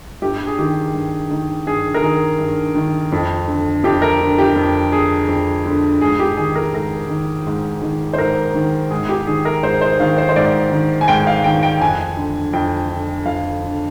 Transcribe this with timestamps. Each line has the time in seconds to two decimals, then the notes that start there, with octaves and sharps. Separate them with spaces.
0.22 G2 G4
0.47 G#4
0.58 D#3 G4
0.94 G2
1.31 D#3
1.66 G2 G#4
1.94 A#4
2.02 D#3 G#4
2.39 G2
2.75 D#3
3.12 F2
3.48 D3
3.84 F2 G4
4.02 A#4
4.20 D3
4.38 G4
4.56 F2
4.92 D3 G#4
5.28 F2
5.66 D3
6.01 G#2 G#4
6.19 G4
6.37 D#3 G#4
6.55 A#4
6.73 G#2 A#4
7.09 D#3
7.46 G#2
7.82 D#3
8.13 C5
8.18 G#2 A#4
8.54 D#3
8.90 G#2 G#4
9.09 G4
9.27 D#3 G#4
9.45 A#4
9.63 G#2 C5
9.81 C5
10.00 D#3 F5
10.18 C5
10.29 C5
10.36 G#2 D5
10.72 D#3
11.01 G#5
11.08 G#2 G5
11.27 F5
11.44 D#3 G5
11.63 G5
11.81 F2 G#5
12.17 D3
12.53 F2 G5
12.89 D3
13.26 F2 F5
13.62 D3